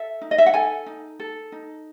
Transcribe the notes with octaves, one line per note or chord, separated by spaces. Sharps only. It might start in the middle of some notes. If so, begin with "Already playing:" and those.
Already playing: A4 E5
D#4
D#5
E5
F#5
A4 G#5
D#4
A4
D#4